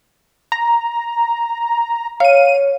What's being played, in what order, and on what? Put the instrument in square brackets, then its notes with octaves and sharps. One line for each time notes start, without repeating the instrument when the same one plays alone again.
[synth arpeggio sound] A#5
[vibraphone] C#5 [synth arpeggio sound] F5 D#7